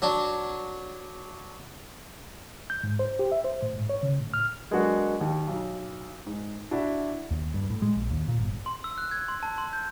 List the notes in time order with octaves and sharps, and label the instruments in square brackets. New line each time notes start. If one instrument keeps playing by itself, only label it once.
[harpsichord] F#3 D4
[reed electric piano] G6
G#2
C5
G4
E5
C5
A2
G#2
C#5
C#3
A2
F6
[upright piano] F#3 G#3 A#3 B3 D4 F#4
D#2
B1
G#2
D4 E4 F#4
[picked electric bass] D#2
G2
A2
G#3
A#1
D#2
A#2
G1
[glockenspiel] C6
E6
F#6
G#6
C6
A5
C6
G6